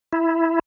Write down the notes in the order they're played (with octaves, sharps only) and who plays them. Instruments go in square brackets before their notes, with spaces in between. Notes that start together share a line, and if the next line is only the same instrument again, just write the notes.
[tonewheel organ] E4